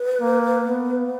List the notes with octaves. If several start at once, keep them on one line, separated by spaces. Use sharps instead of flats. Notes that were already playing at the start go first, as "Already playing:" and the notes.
Already playing: B4
A#3
B3